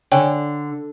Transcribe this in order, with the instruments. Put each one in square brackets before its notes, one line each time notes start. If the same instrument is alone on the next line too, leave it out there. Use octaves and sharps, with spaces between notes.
[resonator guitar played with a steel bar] D3 [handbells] C#5 G5 G#5